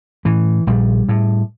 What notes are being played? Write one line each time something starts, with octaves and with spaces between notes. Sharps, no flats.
A2 E3
A#1 G3
A2